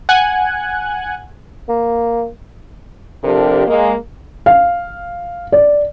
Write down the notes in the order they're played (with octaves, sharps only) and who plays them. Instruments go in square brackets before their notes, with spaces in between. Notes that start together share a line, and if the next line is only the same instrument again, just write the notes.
[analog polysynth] F#5 G#5 F#6 G#6
[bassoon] A#3
[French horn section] C3 F3 D4 G4 A4 A#4
G#3 A#3
[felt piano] F5
D5